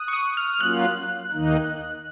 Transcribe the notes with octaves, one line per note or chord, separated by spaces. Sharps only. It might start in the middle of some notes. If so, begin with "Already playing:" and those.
Already playing: D#6 F#6
C#6
D#6
F6
F6
F#3 A#3 C#4 F4 F#6
D#2 D#3 A#3 D#4